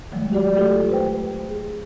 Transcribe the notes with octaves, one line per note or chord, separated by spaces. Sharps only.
D#3 E3 F#3 G#3 A3
F#4 G4 D5
A3 F4 G4 A4
B4 C5 G5
G#4